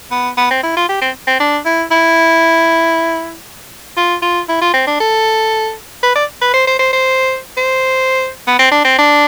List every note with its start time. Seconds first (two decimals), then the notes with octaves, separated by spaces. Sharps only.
0.11 B3
0.38 B3
0.51 C4
0.63 E4
0.77 F4
0.89 G4
1.02 C4
1.27 C4
1.40 D4
1.66 E4
1.91 E4
3.97 F4
4.22 F4
4.49 E4
4.62 F4
4.74 C4
4.87 D4
5.00 A4
6.03 B4
6.15 D5
6.42 B4
6.54 C5
6.67 C5
6.79 C5
6.93 C5
7.57 C5
8.48 B3
8.59 C4
8.72 D4
8.85 C4
8.99 D4